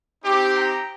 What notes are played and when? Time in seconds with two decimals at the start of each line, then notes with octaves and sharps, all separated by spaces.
0.23 C4 D#4 G4
0.53 G5 A#5